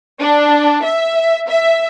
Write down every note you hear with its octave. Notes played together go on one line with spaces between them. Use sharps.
D4
E5
E5